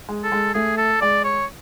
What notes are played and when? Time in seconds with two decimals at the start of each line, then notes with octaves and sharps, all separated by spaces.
0.09 G#3
0.24 A4
0.32 G#3
0.54 A3 G#4
0.78 A4
1.01 G#3 D5
1.24 C#5